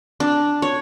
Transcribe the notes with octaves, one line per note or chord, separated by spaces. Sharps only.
D4
C#5